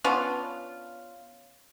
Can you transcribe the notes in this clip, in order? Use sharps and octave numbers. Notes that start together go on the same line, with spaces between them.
B3 C#4 D4 F4